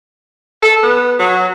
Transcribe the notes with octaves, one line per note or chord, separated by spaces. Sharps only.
A4
B3
F#3